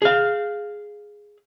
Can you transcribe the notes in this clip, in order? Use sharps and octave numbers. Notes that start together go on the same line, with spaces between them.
G#4 F5